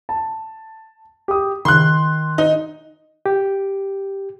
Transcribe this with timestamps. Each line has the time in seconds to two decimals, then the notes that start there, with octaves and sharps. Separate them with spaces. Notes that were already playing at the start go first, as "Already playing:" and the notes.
0.09 A5
1.28 G4 D#6
1.65 D#3 C6 F#6
2.38 D#4
3.26 G4